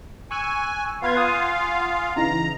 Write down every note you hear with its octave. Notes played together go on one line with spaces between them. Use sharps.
G#5 C#6 E6 F#6
B3 F4 B4 F5 G#6
F#5 G#5 D#6
C#3 E3 D#4 A#5